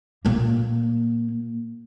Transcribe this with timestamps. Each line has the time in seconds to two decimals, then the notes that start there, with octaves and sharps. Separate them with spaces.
0.25 A#2 A#3